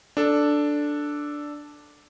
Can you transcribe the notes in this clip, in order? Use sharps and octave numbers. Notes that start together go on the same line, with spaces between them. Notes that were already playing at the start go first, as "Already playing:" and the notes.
D4 A4